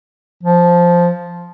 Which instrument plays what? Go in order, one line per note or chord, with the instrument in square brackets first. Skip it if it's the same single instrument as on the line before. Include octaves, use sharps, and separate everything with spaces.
[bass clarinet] F3